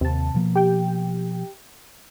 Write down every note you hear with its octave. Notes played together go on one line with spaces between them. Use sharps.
D#2 C3 A5
B2 F3 A#3
G4 G5